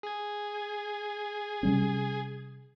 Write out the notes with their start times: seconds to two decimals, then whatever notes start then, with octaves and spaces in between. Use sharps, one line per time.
0.03 G#4 G#6
1.63 C3 G3 C#4